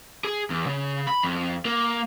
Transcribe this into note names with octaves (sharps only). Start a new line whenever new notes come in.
G#4
E2
C#3
B5
F2
A#3